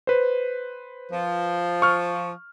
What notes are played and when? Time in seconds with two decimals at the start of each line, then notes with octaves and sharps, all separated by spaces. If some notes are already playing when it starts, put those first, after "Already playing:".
0.07 B4 C5
1.11 F3
1.82 C#6 F6